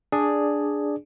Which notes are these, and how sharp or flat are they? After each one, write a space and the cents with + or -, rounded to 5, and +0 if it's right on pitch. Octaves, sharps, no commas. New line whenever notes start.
D4 +0 G#4 +0 D5 +5